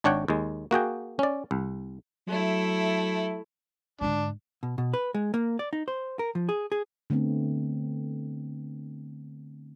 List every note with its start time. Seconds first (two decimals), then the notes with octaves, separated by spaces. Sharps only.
0.04 G#1 D4 C#5 F#5 G5
0.28 D#2 G#3
0.71 A#3 F#4 G#4 G5
1.19 C#4 D5
1.51 C2
2.28 F#3 A3 E4
4.01 G#2 D3 D4
4.63 B2
4.78 B2
4.94 B4
5.14 G#3
5.34 A#3
5.59 D5
5.73 D#4
5.88 C5
6.19 A#4
6.35 F3
6.49 G#4
6.72 G#4
7.10 D3 A3 B3 C4